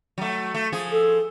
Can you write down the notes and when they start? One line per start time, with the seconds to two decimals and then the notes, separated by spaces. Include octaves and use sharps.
0.18 F#3 A3
0.55 A3
0.72 F3 G#4
0.92 A4